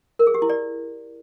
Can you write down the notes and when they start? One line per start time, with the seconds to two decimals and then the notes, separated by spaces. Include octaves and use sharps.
0.19 A#4
0.27 G#4
0.34 G4
0.42 E4
0.49 D5